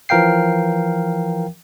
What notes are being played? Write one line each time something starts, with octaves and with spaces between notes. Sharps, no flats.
E3 F3 A#4 F5 G5 C7